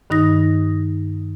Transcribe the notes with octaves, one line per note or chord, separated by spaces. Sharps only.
G2 D#3 D#4 D#6 A#6